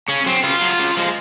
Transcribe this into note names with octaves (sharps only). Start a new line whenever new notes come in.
C#3 C#4
F#3 C4
C#3 F4
F#3
C#3
F3 G#3